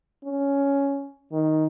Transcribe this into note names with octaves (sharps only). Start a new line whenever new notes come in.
C#4
D#3